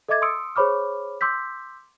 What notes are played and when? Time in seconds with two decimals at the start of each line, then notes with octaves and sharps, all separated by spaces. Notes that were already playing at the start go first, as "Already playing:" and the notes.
0.08 A4 D#5 E5 D6 G#6 A6
0.22 C6 D#6 E6 C#7 D7
0.56 G#4 C5 C#5 B5 D6 F6
1.21 C6 D6 E6 G6 B6